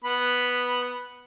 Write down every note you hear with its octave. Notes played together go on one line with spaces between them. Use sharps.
B3 B5